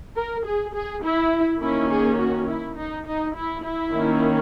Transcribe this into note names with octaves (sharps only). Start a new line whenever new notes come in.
A#4
G#4
G#4
E4
D#3 A#3 C#4 E4
G#4
F#4
E4
D#4
D#4
E4
E4
D#3 A#3 C#4